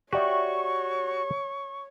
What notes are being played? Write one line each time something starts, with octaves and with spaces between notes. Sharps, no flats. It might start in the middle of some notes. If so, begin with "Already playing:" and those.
F#4 G4 C#5 D5 E5 C#6